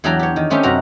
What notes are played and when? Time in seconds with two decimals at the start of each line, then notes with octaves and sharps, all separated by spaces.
0.04 E2 F#3 D4 G4 D5 A#5
0.19 G4 C#5
0.36 D#3
0.50 A3 C4 C#4 D#4 G4
0.63 F#2 C3 F#4 A#5